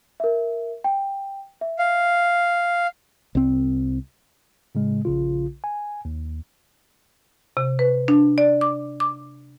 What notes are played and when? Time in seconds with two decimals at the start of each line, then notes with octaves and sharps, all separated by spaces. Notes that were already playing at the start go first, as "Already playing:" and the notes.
0.20 A#4 E5
0.84 G5
1.61 E5
1.79 F5
3.35 C2 C4
4.75 A2 C#3 G#3
5.05 A#1 C#3 F4
5.64 G#5
6.05 D#2
7.57 C3
7.79 B4
8.08 D4
8.38 D5
8.61 D6
9.00 D6